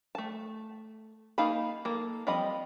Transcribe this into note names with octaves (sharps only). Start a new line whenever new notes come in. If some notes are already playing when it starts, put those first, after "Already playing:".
A3 A5
A#3 D#4 F5 A5 B5
A#3 A4
F3 G3 C4 D#5 B5